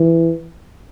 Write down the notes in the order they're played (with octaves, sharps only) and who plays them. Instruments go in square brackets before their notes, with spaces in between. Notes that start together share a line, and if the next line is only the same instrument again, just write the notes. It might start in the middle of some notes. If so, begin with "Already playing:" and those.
Already playing: [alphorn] E3